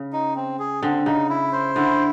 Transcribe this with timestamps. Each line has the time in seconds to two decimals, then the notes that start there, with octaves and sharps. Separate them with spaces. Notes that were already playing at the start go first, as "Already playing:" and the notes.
Already playing: C#3
0.13 D#4
0.36 C4
0.59 G#4
0.83 D3 C4
1.06 C#3 D#4
1.29 E4
1.52 C5
1.75 D3 E4